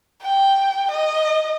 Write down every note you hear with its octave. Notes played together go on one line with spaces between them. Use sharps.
G5
D#5